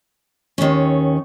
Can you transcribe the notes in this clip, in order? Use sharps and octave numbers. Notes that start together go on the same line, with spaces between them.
D#2 D#3 C#4